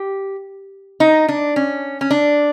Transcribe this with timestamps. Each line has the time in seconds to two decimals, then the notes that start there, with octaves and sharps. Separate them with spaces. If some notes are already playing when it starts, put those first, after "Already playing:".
Already playing: G4
1.00 D#4
1.29 D4
1.56 C#4
2.01 C#4
2.11 D4